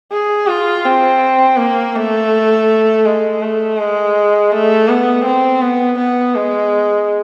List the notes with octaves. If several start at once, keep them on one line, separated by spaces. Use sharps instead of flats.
G#4
F4
C4
A#3
A3
G#3
A3
G#3
A3
B3
C4
B3
B3
G#3